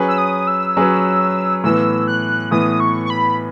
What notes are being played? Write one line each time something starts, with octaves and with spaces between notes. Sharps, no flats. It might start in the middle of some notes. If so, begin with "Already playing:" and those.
Already playing: F#3 C#4 G#4 B4
E6
D#6
E6
F#3 C#4 G#4 B4
A2 E3 B3 E6
F#6
A2 E3 B3 D#6
C#6
C#6
B5